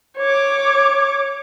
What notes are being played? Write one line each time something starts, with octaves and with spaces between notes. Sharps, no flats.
C#5 D6